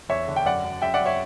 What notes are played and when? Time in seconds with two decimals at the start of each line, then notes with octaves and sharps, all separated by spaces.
0.09 E2 C#5 E5
0.28 D3
0.36 G5
0.46 F#2 D5 F#5
0.64 F#2
0.82 F#2 E5 G5
0.94 D5 F#5
1.00 F#2
1.06 C#5 E5